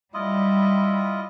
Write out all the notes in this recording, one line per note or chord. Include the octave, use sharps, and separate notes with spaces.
G3 E4 F4 D#5